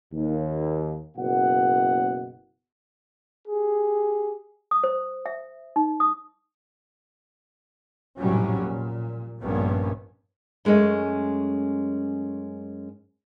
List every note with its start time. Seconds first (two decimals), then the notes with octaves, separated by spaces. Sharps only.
0.13 D#2
1.17 F#1 B2 F#5
3.48 G4 G#4
4.71 D#6
4.84 C5
5.26 E5
5.76 D#4
6.00 D#6
8.19 F1 A#1 A2 F#3 G3 C#4
8.60 A#2
9.42 A#1 G2 A#3 B3 C#4
10.65 F#2 G#3 A3 C#4 D#5